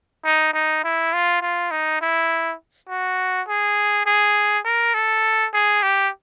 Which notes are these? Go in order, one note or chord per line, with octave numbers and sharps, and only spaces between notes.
D#4
D#4
E4
F4
F4
D#4
E4
F#4
G#4
G#4
A#4
A4
G#4
G4